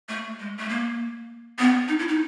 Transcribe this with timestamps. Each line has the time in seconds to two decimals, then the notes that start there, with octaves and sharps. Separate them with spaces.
0.09 A3
0.40 G#3
0.58 A3
0.69 A#3
1.59 B3
1.88 D#4
1.99 E4
2.08 D#4